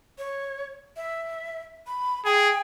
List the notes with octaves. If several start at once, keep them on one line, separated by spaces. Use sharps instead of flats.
C#5
E5
B5
G#4 G5